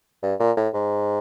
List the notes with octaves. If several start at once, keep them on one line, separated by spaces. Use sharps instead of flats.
G2
A#2
A2
G#2